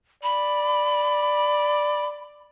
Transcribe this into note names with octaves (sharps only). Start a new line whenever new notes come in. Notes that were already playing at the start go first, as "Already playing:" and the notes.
D5 B5